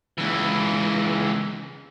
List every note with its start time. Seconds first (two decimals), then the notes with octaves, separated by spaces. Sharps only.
0.18 C#2 E3